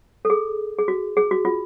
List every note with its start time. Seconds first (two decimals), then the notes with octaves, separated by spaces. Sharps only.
0.25 A4
0.30 G#4
0.79 G#4
0.88 F#4
1.17 G#4
1.31 F#4
1.45 F4